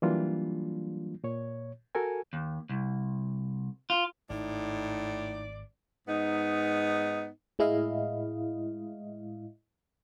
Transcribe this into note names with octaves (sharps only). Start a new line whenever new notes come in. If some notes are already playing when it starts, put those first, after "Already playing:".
E3 F#3 G3 A#3 D4 F4
A#2 C#5
F#4 A4 A#4 G#5
D#2
C2
F4
G#1 A2 D#4 D5
G#2 B3 D#4
A2 G#3 E4 D#5 F5